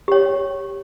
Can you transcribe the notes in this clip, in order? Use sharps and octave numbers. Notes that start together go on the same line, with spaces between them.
G4 C#5